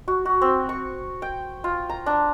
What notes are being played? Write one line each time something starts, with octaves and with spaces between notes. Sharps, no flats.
F#4
F#4
C4
C#6
G5
F4
A#5
D4